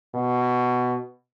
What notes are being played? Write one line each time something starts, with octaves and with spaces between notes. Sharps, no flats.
B2